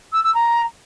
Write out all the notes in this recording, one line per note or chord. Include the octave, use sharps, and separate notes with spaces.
E6
E6
A#5